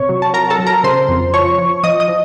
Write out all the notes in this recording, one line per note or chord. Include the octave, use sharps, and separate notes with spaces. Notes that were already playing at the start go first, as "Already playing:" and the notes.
Already playing: C3 C#5 C#6
F#3
A5
F#3 A#4 A#5
A4 A5
F#3
A#4 A#5
C#3 C5 C6
F2
F3 C#5 C#6
F3
F3 D#5 D#6
D#5 D#6
F3